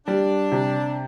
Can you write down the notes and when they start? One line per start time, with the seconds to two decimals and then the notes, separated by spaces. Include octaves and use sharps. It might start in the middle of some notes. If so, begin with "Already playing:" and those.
0.06 G3 D4
0.52 C3